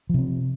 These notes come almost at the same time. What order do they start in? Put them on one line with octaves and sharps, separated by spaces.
F3 C3 C4